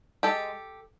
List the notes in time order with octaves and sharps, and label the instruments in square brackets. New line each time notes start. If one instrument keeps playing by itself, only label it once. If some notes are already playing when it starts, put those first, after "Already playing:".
[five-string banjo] G#3 G4 A4